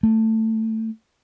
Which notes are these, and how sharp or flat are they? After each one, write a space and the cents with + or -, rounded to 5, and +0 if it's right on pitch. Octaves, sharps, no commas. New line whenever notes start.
A3 +15